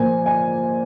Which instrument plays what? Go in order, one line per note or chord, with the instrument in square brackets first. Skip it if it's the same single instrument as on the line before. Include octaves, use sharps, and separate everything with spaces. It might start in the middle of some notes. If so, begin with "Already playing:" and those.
Already playing: [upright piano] A#2 F3 A#3 G#5
G#5